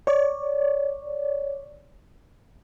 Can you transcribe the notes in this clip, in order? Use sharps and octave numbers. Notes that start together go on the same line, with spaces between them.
C#5 D5